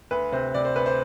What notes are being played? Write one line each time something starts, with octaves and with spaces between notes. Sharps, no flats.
D2 B4
C3 C5
C3 D5
C5
D2 B4
C5